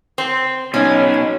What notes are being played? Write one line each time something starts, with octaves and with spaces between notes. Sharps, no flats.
C4
B2 C#4 D#4